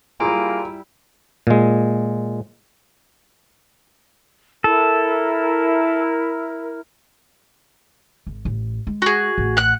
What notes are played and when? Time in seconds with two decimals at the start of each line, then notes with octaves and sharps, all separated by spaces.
0.20 G3 A#3 E4 F4 G#4 G#5 A#5 D7
1.47 A#2 G#3
4.64 E4 A4 A#4
8.27 G#1
8.45 A1
8.87 G#3
9.02 F#4 G#4
9.38 A1
9.57 F#5 F#6